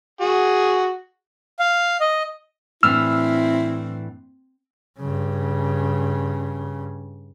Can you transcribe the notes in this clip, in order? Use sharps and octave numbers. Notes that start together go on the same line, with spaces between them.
F#4 G#4
F5
D#5
A2 E3 C4 D4 E4 E6 F6
G2 C#3